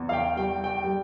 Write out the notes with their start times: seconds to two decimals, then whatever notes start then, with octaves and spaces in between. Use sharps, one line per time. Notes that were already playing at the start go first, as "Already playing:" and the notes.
Already playing: E2
0.09 F5
0.13 G5
0.36 G3 G5
0.64 G5
0.84 G3